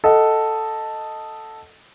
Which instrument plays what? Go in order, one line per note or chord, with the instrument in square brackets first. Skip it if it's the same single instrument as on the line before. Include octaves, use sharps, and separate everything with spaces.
[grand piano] A4 D#5 F#5